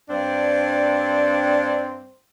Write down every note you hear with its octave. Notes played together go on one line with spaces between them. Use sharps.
G2 C4 D4 C5